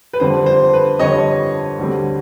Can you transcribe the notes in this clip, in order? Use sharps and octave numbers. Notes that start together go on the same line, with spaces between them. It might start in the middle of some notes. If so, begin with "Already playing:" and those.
B4
F2 D3 G3 C5
C5
B4
F2 D3 G3 C#5 D#5
D2 D3 G3 C4